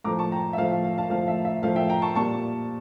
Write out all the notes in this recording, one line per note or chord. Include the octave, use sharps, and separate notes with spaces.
A2 F3 A3 A#5 D6
A5 C#6
G5 A#5
E5
A2 F3 A3 F5
F5
F5
F5 A5
A2 F3 A3 F5
E5
E5
A2 F3 A3 F5
E5 G5
G5 A#5
A5 C#6
A#2 G3 A5 C#6